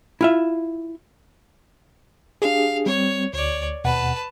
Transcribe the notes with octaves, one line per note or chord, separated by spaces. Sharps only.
E4 F4 E5
D4 G4 G#4 F5
G3 C4 C#5
D2 C#5 D5
D#2 B2 B4 F#5 A5